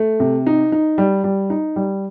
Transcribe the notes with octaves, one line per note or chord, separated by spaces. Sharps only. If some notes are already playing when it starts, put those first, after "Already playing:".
Already playing: A3
C3
D#4
D#4
G3
G3
D#4
G3